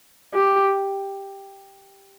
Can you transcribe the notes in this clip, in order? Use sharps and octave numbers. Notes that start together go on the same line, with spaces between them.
G4